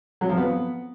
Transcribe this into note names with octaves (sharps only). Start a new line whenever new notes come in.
F#3
F3
B3